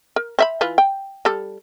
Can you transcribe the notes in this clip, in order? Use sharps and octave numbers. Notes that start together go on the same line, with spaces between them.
A#4
C4 E5 B5
E3 F4 B4
G5
G3 A4